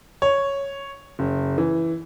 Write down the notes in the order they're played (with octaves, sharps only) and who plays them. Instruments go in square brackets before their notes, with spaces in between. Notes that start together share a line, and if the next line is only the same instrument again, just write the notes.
[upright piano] C#5
F#1
E3